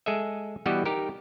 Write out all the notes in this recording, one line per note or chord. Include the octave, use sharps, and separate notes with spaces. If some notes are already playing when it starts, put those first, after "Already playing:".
G#3 G#4 A4 D#5 E5
E3 G3 B3 F#4 G4 D#5
D#4 G4 A#4